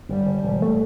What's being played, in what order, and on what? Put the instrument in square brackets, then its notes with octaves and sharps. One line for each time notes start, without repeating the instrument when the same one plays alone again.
[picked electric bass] G1 [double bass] G3
[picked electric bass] G1
E1
A3